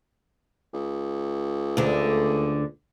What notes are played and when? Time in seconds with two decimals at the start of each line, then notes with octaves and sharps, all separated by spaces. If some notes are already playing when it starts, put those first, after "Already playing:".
0.73 C#2
1.77 D2 D3